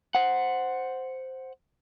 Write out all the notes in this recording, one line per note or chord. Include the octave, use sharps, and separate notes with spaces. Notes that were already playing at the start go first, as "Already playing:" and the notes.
C5 F#5